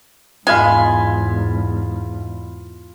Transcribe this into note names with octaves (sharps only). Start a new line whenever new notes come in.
E2 G#2 G#3 F4 F5 G#5 B5